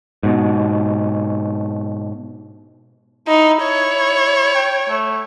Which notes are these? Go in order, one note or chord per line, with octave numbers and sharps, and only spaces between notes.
G#2 B2
D#4 E4
C#5
G5
A3